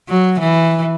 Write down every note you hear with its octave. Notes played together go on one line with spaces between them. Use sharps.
F#3
E3